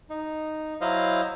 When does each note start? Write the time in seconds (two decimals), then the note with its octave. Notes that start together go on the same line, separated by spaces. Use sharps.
0.10 D#4
0.81 F#3 E4 C5 D#5 F5